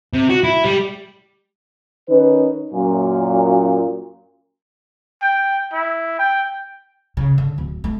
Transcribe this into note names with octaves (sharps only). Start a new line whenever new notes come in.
C3
F#4
E4
G3
D#3 C#4 D#4 B4
F#2 A#2
G5
E4
G5
C#3
D3
D1
A3